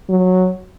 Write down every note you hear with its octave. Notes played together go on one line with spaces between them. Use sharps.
F#3